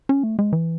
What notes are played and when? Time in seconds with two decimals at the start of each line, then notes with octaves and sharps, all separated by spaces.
0.09 C#4
0.23 A3
0.39 G#3
0.53 E3